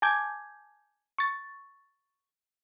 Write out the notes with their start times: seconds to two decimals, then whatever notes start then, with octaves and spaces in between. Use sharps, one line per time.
0.02 G#5 A5 D6 G6 G#6
1.18 C#6 A6